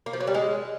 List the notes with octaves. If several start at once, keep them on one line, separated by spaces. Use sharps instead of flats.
A#3
F3
F#3
G3
G#3